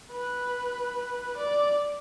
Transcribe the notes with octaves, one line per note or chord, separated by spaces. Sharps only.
B4
D5